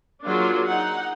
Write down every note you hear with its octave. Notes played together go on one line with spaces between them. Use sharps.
F#3 A#3 D4 F4 G#4
D#4 F#5